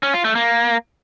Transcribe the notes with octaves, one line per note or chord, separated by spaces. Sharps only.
C#4
F4
A3
A#3